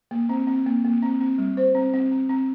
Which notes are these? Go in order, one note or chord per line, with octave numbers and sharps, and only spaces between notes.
A#3
C4
C4
A#3
A#3
C4
C4
G3
C5
C4
C4
C4
C4